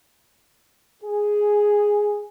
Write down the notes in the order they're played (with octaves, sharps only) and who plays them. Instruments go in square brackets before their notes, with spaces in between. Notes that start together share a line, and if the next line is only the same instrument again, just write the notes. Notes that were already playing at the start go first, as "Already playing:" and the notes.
[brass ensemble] G#4